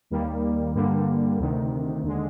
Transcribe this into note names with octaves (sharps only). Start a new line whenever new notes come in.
D#2 D#3 G3 A#3
G2 D3 G3 A#3
D2 C3 D#3
D#2 D3 G#3